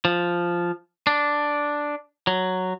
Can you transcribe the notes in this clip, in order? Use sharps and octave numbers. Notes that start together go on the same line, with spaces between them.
F3
D4
F#3